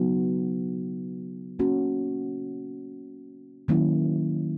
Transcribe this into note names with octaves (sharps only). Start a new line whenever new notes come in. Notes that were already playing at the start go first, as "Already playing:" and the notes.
Already playing: C#3 F#3 B3 D#4 F#4
A#3 C#4 F#4
D#3 F#3 A#3 C#4 E4